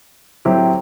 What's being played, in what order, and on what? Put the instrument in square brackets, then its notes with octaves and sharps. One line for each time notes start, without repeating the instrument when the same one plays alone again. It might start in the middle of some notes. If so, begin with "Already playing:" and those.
[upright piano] A2 F#3 C4 E4 G4